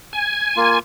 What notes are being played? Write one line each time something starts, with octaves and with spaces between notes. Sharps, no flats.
G#5
A#3 F4